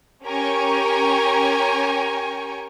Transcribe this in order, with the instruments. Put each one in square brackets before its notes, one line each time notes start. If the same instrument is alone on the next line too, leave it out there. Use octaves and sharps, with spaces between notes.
[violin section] C#4 G4 A#4 G5 G#5 C#6